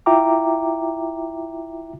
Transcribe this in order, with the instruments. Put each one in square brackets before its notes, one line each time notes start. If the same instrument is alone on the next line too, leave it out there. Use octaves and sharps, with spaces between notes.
[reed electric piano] E4 F4 E5 G5 A#5 D6